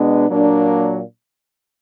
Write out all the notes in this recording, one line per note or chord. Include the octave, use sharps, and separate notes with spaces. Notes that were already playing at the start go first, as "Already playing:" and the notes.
Already playing: B2 G#3 B3 D4
A#2 F#3 A#3 D4